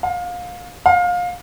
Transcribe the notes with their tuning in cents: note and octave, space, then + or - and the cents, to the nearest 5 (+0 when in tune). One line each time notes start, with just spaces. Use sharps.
F5 +25
F5 +25